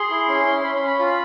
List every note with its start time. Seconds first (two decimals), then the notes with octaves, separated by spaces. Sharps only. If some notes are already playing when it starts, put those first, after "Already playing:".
Already playing: G#4 C6
0.10 E4
0.28 C#4
0.46 C#4
0.63 C#4 B5
0.75 B5
0.81 C#4
0.87 B5
0.99 F4